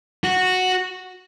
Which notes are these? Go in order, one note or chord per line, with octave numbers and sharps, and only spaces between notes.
F#4